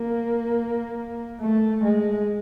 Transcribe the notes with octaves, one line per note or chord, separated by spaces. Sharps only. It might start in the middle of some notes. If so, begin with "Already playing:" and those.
Already playing: A#3
A3
G#3